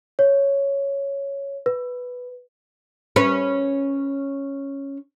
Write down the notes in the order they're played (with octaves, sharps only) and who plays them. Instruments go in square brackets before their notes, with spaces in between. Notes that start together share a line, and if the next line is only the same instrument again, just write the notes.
[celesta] C#5
B4
[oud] C#4 B4